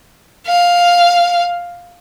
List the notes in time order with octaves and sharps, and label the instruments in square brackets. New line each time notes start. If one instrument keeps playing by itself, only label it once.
[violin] F5